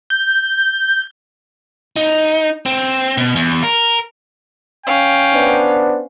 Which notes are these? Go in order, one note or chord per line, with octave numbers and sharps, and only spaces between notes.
G6
D#4
C4
B2
E2
A#4
C#4 F5 G5
B3 D4 C5